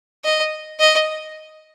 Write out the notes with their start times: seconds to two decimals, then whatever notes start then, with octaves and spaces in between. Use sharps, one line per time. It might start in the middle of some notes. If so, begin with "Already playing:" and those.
0.24 D#5
0.80 D#5